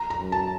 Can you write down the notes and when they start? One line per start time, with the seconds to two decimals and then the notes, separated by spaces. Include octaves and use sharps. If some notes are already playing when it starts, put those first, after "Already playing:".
Already playing: A#5
0.10 A#5
0.21 F#2
0.32 A5